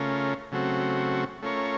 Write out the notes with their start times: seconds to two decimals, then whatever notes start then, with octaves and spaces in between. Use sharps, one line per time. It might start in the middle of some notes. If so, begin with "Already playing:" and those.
Already playing: C#3 A3 C#4 F4 A#4
0.52 C#3 F#3 A3 C4 F#4
1.42 A3 C#4 F4 A#4 C#5